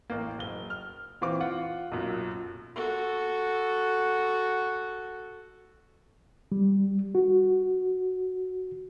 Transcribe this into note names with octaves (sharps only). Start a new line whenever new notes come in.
A1 A#3
F#1 G7
F6
A#2 E3 C4 F5 D6
F4 F#5
B1 F#2 A#2
F#4 A4
G3
F#4